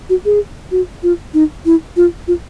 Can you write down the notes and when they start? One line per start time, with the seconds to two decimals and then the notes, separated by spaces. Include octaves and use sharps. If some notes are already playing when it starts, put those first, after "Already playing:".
0.10 F#4
0.25 G#4
0.71 F#4
1.03 F4
1.34 D#4
1.66 E4
1.97 F4
2.28 F4